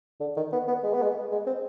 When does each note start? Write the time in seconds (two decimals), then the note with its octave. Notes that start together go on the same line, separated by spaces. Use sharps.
0.20 D3
0.37 D#3
0.52 B3
0.68 B3
0.84 G#3
0.94 B3
1.03 G#3
1.32 G#3
1.47 C4